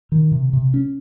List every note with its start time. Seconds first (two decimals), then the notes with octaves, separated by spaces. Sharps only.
0.12 D#3
0.32 C3
0.53 C3
0.74 C#4